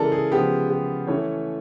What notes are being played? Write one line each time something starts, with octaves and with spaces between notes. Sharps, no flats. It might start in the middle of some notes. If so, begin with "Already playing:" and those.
Already playing: C#3 E3 G#3 A4 A#4 D5
G#4
C#3 F3 G#3 B3 G4
G4
E3 A3 C#4 C#5